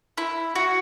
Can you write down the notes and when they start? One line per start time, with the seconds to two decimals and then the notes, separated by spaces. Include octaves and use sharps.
0.18 E4
0.55 F#4